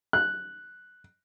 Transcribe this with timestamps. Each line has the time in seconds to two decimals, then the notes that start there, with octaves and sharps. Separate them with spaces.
0.13 F#6